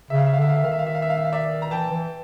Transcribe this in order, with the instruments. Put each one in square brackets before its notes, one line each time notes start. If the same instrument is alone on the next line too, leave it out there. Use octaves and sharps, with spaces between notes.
[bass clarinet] C#3 [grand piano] E5
[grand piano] F5
E5
F5
[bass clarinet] D3 [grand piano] E5
[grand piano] F5
E5
[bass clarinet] D#3 [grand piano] F5
[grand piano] E5
F5
E5
F5
E5
F5
E5
F5
D5 E5
A#5
[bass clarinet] E3 [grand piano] G5 A5
[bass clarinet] E3